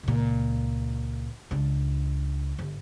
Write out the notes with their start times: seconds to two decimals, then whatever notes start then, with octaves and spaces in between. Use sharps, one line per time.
0.03 C#2 A#2
1.51 C#2 D4
2.59 G1